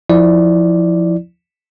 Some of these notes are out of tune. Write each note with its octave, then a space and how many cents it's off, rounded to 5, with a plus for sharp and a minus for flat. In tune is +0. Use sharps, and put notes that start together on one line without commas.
F3 +0 E4 -10 D5 +0